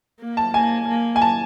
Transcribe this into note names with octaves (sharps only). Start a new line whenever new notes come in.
A#3
A5
A#3 G#5
A#3
G#5
A5